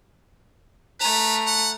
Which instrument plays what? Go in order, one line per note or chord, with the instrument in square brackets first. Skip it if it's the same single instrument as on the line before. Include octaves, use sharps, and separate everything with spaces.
[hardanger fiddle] A3 A#5 [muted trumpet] B4
[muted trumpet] F#5